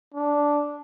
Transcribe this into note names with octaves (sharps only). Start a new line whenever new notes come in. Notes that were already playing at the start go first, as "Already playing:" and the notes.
D4